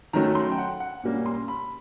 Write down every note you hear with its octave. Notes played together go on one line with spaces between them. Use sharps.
D#3 F#3 A3 C#4 A#5
C6
G5
F#5
F#5
A#2 G3 A#3 C#4
C6
B5